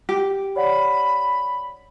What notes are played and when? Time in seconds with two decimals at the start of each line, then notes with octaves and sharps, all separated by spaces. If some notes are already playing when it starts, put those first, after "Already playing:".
0.09 G4
0.56 C#5 D5 F#5 B5